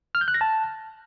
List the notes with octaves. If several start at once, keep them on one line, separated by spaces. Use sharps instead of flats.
F6
G6
F#6
A#6
A5